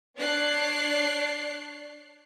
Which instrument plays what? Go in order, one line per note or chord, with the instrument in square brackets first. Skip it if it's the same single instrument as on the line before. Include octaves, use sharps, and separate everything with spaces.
[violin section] D4 C#5 D5 F#6 C7